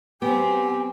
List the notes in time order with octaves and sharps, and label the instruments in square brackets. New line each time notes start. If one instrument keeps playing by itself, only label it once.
[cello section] F#3 C4 [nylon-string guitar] B3 [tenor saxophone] G4 [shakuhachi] G#5